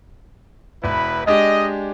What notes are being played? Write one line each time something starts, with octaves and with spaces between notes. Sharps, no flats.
E1 E4 B4
G#3 D4 G4 D#5